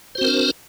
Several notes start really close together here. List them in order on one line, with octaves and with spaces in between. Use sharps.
C5 F#4 C4 A#4 D4